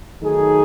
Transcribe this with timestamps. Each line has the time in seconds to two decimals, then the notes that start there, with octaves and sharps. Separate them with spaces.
0.22 D#3 F#3 A3 D#4 G#4